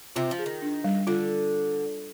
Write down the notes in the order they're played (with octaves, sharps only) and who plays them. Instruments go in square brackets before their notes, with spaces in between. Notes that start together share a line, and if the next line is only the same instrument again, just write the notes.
[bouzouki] C3 C4 [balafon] F4
[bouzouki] F3
[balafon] G#4
[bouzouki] D#3
[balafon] D4
G3
[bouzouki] D3 [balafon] F4